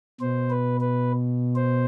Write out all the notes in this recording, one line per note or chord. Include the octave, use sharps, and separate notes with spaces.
B2 C5
B4
B4
C5